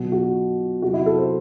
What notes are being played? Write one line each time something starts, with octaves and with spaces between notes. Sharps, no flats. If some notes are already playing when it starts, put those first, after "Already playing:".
Already playing: B2 F#3 F#4
F#4
C3 F#3 F#4
E4
A4
C5